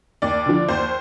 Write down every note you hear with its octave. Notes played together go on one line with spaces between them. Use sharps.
D#2 D5
D3 F3
D#2 C5